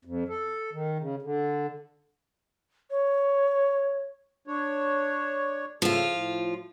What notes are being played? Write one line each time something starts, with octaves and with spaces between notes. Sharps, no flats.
F2
A4
D#3
C#3
D3
C#5
D4 C#5
C#3 F3 A3 F4 A4
A2